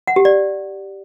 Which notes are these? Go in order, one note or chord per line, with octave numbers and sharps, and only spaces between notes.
F#5
G4
D5